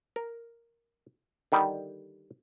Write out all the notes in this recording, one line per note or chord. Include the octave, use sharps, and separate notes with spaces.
A#4
D3 D#3 G3